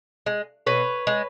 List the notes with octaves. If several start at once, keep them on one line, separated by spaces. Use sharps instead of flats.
G#3
B2 B4 C#5
G#3